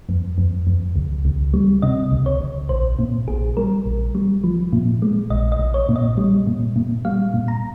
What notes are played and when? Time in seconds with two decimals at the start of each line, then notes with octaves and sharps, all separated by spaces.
0.09 F2
0.38 F2
0.67 F2
0.96 C#2
1.25 C#2
1.54 G3
1.82 C3 D#5
2.12 C#2
2.26 C#5
2.41 C#2
2.69 A#1 C5
2.99 A#2
3.27 A#1 G#4
3.57 G3 A#4
3.86 A#1
4.15 G3
4.44 F3
4.73 A#2
5.02 G#3
5.30 A#1 D#5
5.52 D#5
5.59 A#1
5.74 C#5
5.89 A#2
5.96 D#5
6.17 G3
6.47 A#2
6.76 A#2
7.05 G3 F5
7.34 A#2
7.48 A#5